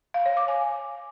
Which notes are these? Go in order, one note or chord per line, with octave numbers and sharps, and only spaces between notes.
F5
C#5
D6
G#5